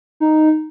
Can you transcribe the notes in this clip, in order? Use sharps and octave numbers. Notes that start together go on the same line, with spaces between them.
D#4